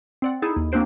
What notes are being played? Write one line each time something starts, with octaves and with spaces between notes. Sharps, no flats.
C4 D5 F#5
D#4 E4 G#4 A4
D#2
A#3 C4 D4 F#4 C5 D7